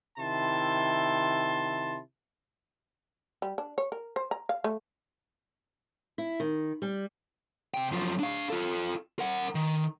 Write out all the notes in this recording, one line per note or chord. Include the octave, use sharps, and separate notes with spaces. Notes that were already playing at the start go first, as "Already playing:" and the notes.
C3 D#3 E4 A5 C6
G3
D4
C#5
A#4
C5
A#5
F5
A3
E4
D#3
G3
C3 G5
F#2 F3
D4 F5
F4 A4
A#4 F#5
D#3